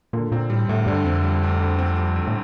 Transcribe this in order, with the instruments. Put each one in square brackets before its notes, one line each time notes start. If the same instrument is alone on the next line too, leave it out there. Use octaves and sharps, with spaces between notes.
[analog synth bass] A#2 [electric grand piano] D3
[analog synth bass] A#2 [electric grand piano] C4
[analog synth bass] A2 [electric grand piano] G3
[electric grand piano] D2 [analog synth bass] A2
[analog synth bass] G2 [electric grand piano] D3
[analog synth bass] F2 [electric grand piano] C4
[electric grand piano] G3
D2
D3
C4
G3
D2
[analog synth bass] A2